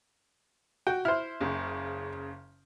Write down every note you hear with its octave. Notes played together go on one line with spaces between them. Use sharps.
F#4 G5
E4 C5 F6
F#1 C#3